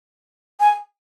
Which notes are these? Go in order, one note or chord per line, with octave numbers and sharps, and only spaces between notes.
G#5